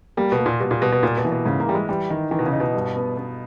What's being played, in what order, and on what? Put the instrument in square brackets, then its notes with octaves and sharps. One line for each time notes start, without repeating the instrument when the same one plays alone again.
[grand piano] G3 [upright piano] A#3
[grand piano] B2
[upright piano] A#3
[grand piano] A#2
[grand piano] B2 [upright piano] G3
[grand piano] A#2
[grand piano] B2 [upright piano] G3
[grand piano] B2
[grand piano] A#2 [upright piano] A#3
[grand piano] B2
[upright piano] E3
[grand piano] B2
[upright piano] G#2 [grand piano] C#3
[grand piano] A#3
[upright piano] E3 [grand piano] G3
[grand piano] G#3
[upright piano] E3 [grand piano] G3
[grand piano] D#3 [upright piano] D#4
[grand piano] D#3 [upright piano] E3
[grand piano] B2
C#3
[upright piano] D#4
[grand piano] B2
[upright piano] G2
B3
B3